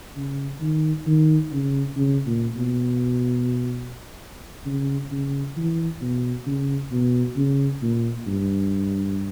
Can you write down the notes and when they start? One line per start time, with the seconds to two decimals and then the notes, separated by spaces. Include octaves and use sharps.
0.16 C#3
0.61 D#3
1.06 D#3
1.52 C#3
1.96 C#3
2.26 A#2
2.56 B2
4.66 C#3
5.12 C#3
5.57 E3
6.01 B2
6.47 C#3
6.92 B2
7.36 C#3
7.82 A#2
8.27 G2